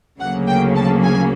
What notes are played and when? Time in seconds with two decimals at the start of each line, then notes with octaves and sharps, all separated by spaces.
0.20 D2 C#3 F#3 A#3 F#5
0.47 G5
0.76 A5
1.03 G#5